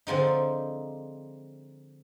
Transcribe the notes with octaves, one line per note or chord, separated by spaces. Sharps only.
D3 F3 G#3 C4 D#4